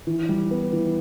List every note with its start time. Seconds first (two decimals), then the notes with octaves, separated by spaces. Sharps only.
0.07 E3
0.29 G3
0.51 B3
0.73 E3